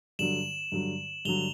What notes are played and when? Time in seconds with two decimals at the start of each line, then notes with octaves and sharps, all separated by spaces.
0.19 G2 D3 F#3 E7 F#7
0.72 G2 D3 F#3
1.25 G2 D3 F#3 F7 G7